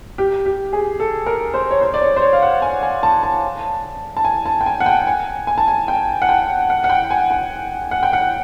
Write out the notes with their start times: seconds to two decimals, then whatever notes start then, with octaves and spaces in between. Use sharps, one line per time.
0.18 G4
0.46 G4
0.73 G#4
1.00 A4
1.26 A#4
1.54 C5
1.71 C#5
1.81 C5
1.94 D5
2.02 C#5
2.16 C5
2.21 C#5
2.33 F5
2.42 F#5
2.62 G#5
2.83 G#5
3.03 A5
3.23 A5
4.17 A5
4.24 G#5
4.46 A5
4.61 G5
4.66 G#5
4.80 F#5
4.86 G5
5.07 G#5
5.47 G#5
5.58 A5
5.68 G#5
5.88 G5
6.22 F#5
6.29 G5
6.70 F#5
6.84 F#5
6.90 G5
7.11 G#5
7.31 G#5
7.91 F#5
8.03 G5
8.13 F#5